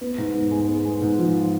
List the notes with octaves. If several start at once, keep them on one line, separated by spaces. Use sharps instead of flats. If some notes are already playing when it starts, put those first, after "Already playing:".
B3
G#2
G#2
G#3
B3
G#3
G#2
F3